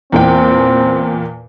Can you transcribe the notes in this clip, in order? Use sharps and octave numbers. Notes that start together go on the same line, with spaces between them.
E2 A#2 C4 G5